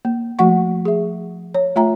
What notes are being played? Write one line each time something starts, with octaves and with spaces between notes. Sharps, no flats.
A#3
F3 A3 F#4 F#5 C#6
G#4 E5
C#5
A3 F4 E5 G5 A#5